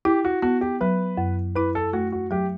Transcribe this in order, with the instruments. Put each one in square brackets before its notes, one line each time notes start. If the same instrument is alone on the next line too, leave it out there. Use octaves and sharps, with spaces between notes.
[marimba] E4 [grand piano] G4
[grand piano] F#4
[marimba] B3 [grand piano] F#4
[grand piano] G4
[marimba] F#3 [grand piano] B4
[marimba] F#2
[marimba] E4 [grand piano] B4
[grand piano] A4
[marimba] A3 [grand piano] F#4
[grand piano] F#4
[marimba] F#3 [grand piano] G4